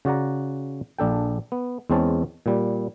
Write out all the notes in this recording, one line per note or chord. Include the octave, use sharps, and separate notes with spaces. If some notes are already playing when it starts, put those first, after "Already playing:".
C#3 F#4 D5 F#5 A#5
A#1 D4 A4 G5
B3
E2 G#3 C4 C#4 A5
A#2 G3